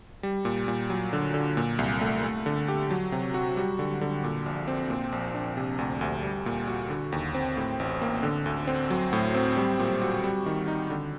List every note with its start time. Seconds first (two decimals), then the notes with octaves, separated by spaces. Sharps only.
0.23 G3
0.45 A#2
0.68 A#2
0.90 F#3
1.13 D3
1.34 D3
1.57 A#2
1.79 C2
2.01 A3
2.23 A3
2.46 D3
2.68 G4
2.91 F#3
3.12 C3
3.34 F#4
3.57 G3
3.79 D3
4.01 D3
4.24 A#2
4.46 A#1
4.68 C4
4.90 A#2
5.12 A#1
5.35 D4
5.57 C3
5.78 D2
6.01 D2
6.23 G3
6.46 A#2
6.67 F#4
6.90 D3
7.12 D#2
7.35 C4
7.57 A2
7.79 A1
8.02 A#3
8.23 D3
8.46 D2
8.67 C4
8.90 F#3
9.13 A2
9.35 C4
9.57 G3
9.79 A#2
10.02 F#4
10.24 G3
10.46 D#3
10.68 D#4
10.90 D3